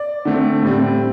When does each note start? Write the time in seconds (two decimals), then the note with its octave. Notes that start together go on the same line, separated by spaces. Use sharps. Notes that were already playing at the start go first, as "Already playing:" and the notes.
Already playing: D5
0.25 D3 A3 C4
0.63 A2 G3 C4